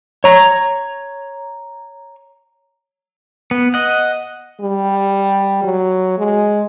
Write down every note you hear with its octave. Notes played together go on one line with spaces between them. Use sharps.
C#5 A#5
B3
D#5 F#5
G3
F#3
G#3